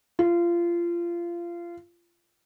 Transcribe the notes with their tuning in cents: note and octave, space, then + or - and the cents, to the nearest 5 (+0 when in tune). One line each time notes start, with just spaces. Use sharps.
F4 -25